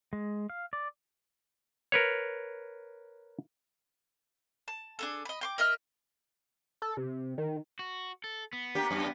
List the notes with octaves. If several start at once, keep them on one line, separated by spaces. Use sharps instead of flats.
G#3
F5
D5
A#4 B4 C#5
A5
D4 G#4 A4
D#5 B5
G5 C6 D6
A#4 D#5 E5 F6
A4
C3
D#3
F#4
A4
B3
A#3 D4 G4
F#2 G3